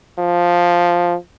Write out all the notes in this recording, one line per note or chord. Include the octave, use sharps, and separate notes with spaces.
F3